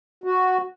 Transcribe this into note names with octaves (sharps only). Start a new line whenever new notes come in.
F#4